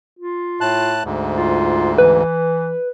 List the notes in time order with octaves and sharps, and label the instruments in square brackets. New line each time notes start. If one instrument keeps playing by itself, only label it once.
[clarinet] F4
[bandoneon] A2 A5 F#6
D2 G#2
[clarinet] F4
[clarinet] E3 [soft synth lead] B4